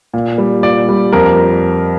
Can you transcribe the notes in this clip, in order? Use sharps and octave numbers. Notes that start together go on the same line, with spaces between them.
A#2
G3
A#2 D5
G3
F2 A#4